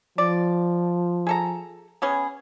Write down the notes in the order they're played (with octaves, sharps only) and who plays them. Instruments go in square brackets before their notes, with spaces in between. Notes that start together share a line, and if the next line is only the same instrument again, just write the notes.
[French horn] F3 [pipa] D5
[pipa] G#4 A4 A#5
B3 C#4 G#4